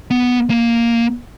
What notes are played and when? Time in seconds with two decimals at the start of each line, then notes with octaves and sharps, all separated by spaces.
0.11 B3
0.50 A#3